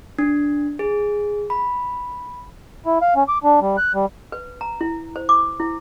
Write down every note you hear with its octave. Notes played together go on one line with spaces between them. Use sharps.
D4
G#4
B5
E4
F5
C#4
D6
D4
G3
F#6
G3
B4
A#5
E4
C5
D6
E4